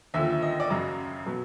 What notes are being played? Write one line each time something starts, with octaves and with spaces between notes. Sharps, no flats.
D#2 D3 F3 E5
E5
D#5
D5
F#2 C#3 F#3 D#5
B2 F#3